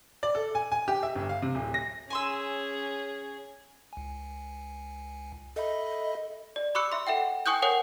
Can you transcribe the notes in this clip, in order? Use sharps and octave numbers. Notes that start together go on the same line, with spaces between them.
D5
A4
G#5
G#5
G4
E5
G1
F5
C3
D1
A#6
C#4 G#4 G#5 C6 E6
C#2 G#5
A4 D#5 E5 B5
D5
B5 C#6 D6 E6 F#6 C#7
E5 C6
A4 E5 F#5 G5
G5 G#5 C#6 D#6 F#6 G6
A#4 C#5 F#5 G#5 D#6